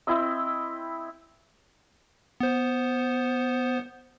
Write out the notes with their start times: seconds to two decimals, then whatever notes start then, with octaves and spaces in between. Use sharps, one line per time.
0.07 C4 E4 D#5 E6
2.40 B3 C5